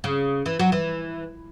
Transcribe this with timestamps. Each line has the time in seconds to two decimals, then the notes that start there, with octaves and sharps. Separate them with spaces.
0.04 C#3
0.46 E3
0.59 F#3
0.72 E3